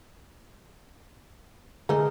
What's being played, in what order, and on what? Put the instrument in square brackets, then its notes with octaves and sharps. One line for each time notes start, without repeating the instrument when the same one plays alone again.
[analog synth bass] D3 [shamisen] E3 A3 D#4 [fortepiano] G#3 [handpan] G#4 A#4